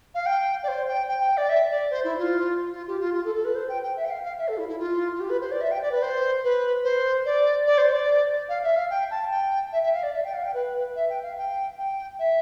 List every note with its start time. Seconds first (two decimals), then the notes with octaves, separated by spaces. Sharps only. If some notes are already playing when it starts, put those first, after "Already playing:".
0.15 F5
0.26 G5
0.63 D5
0.68 C5
0.88 G5
1.09 G5
1.37 D5
1.49 E5
1.71 D5
1.91 C5
2.04 E4
2.19 F4
2.73 F4
2.88 G4
3.01 F4
3.14 F4
3.25 A4
3.35 A4
3.45 B4
3.55 C5
3.69 G5
3.83 G5
3.97 E5
4.05 G5
4.10 F5
4.24 F5
4.38 E5
4.48 A4
4.58 E4
4.69 E4
4.80 F4
5.15 F4
5.20 G4
5.30 B4
5.41 C5
5.51 D5
5.61 E5
5.71 G5
5.82 D5
5.92 B4
6.02 C5
6.44 B4
6.84 C5
7.26 D5
7.67 D5
7.78 C5
7.90 D5
8.49 F5
8.63 E5
8.76 F5
8.90 G5
9.11 A5
9.31 G5
9.73 E5
9.83 E5
9.94 F5
10.03 D5
10.14 E5
10.24 G5
10.34 F5
10.44 G5
10.54 B4
10.96 E5
11.10 G5
11.23 F5
11.38 G5
11.78 G5
12.19 E5